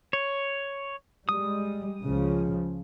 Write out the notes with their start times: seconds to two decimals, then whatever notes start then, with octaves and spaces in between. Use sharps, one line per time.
0.13 C#5
1.29 G3 G#3 D#6
2.04 C#2 C#3 F3